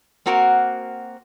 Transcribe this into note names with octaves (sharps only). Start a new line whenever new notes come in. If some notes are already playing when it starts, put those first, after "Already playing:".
A#3 C4 F#4 A#4 F#5